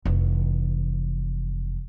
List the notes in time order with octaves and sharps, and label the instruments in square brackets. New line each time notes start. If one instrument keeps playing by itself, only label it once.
[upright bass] F1 E3